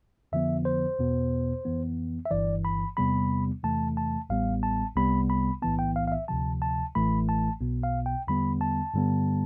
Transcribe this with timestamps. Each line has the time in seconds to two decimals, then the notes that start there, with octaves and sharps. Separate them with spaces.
0.32 F2 D3 F3 B3 E5
0.65 C5
0.99 E2 B2 B3
1.65 F2 E3 B3
2.25 E5
2.31 G1 G2 E3 D5
2.65 B5
2.97 E2 C3 G3 B3 B5
3.63 E2 C3 E3 A3 A5
3.97 A5
4.30 A1 A2 G3 B3 F5
4.63 A5
4.96 C2 C3 G3 B3 B5
5.30 B5
5.62 B1 A2 E3 B3 A5
5.79 G5
5.96 F5
6.07 F5
6.12 E5
6.28 D2 C3 F3 A5
6.62 A5
6.95 A1 A2 E3 A3 B5
7.29 A5
7.61 B1 B2 B3
7.83 F5
8.06 G5
8.28 E2 D3 G3 B3 B5
8.61 A5
8.94 G2 D3 G3 B3